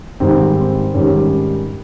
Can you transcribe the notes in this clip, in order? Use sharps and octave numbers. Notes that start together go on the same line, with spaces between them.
G#2 D#3 G3 C4
C4
G#2 D#3 G3 C#4